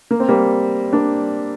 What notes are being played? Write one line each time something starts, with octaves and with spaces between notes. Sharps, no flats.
A#3
C4
G3 A#3
A#3 D4